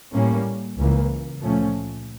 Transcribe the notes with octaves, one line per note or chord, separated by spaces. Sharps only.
A2 G3 A#3 C#4
C#2 C#3 E3 A#3
A#2 F3 A3 C#4